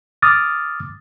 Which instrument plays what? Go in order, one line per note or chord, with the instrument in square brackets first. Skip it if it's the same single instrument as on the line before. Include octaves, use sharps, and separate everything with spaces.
[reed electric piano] D6 D#6 F6 A6